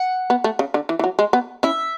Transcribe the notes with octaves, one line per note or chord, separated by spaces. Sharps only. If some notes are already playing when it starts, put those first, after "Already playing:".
Already playing: F#5
B3
A3
C#3
D3
E3
E3
F#3
G#3
B3
C#4 E4 E5